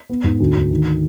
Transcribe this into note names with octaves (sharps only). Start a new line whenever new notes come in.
B3
G#2
D2
D2
D#3